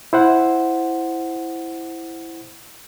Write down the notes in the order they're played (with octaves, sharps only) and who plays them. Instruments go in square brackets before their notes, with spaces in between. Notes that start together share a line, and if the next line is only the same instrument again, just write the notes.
[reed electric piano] E4 C5 F#5